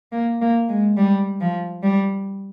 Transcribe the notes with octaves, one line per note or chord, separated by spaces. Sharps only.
A#3
A#3
G#3
G3
F3
G3